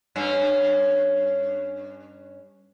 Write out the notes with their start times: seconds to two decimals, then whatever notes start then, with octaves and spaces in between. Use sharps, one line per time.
0.16 G2 C#4